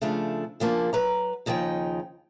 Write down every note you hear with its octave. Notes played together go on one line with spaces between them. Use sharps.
C#3 F3 A3 D4
C#3 F3 A#3 D4
F#3 B4 A#5
D#2 C#3 F3 D#4 G5